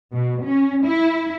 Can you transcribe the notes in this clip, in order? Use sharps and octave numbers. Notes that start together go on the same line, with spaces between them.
B2
C#4
E4